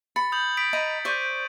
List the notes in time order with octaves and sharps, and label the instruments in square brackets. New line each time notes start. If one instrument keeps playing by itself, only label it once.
[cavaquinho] B5 [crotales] A6 C#7
[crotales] D#6 G6 F#7
D#6 B6 D7
[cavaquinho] D#5 A#5 B5
[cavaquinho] C5 D5 C#6 [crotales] G6 D#7